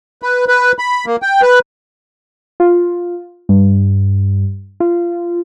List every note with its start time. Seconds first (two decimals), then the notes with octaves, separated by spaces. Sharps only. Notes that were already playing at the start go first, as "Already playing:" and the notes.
0.22 B4
0.48 B4
0.79 B5
1.06 A#3
1.22 G5
1.42 B4
2.60 F4
3.49 G2
4.80 F4